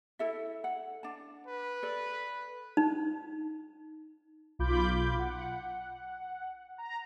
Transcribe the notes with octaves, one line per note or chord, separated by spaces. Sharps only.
E4 A4 E5
F#5
D4 A5
B4
A4 D5
D#4
B1 F4 B5 D6 G6
F#5
A#5